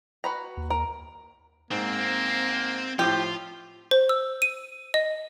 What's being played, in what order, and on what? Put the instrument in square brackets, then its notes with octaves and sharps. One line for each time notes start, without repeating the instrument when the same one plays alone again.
[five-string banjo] F#4 B4 A#5
[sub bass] D#2
[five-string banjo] A#4
[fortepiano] G#2 [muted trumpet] A#3 [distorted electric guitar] C4
[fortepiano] A2 F3 [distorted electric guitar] F4 C6 [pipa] G4
[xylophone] C5
E6
D#7
D#5